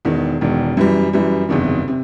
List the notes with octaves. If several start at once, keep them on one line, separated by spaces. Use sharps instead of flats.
E1 E2 D#3
E1 E2 D#3
F#2 E3 G3
F#2 E3 G3
F#1 E2 C3 D#3
C3